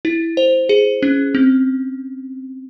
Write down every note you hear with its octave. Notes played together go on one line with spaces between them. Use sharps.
E4
C5
G#4
C#4
C4